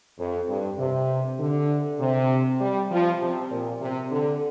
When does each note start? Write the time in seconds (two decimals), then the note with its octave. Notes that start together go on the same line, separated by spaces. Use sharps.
0.19 F2
0.48 G2
0.79 C3
1.40 D3
2.00 C3
2.60 G3
2.91 F3
3.21 C3
3.50 A#2
3.80 C3
4.12 D3